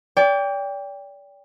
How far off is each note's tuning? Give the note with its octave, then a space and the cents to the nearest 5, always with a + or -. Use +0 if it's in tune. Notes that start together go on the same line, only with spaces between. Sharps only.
D5 -35 G5 +20